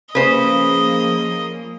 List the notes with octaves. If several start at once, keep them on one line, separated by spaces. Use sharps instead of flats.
C#3 F3 A#3 C#4 G#4 B4 C5 D#5